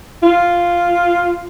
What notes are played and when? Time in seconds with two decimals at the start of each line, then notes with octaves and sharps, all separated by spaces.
0.23 F4